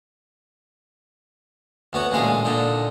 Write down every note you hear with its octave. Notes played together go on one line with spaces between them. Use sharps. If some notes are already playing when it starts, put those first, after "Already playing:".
D2 B3 F#4 C#5
A1 A#2 D3 G#3 G#4 F5
A#2 D3 D4 D#4